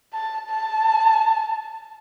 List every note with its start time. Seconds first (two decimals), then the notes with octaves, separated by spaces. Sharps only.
0.13 A5
0.50 A5